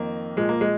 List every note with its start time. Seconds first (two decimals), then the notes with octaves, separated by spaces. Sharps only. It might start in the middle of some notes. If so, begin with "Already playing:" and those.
Already playing: F2 D#3 A#3
0.37 A#2 F3 G#3
0.49 A#3
0.61 G#3